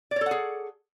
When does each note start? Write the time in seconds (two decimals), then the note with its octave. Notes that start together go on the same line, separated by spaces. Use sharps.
0.11 D5
0.16 C#5
0.21 A4
0.26 F#5
0.31 G#4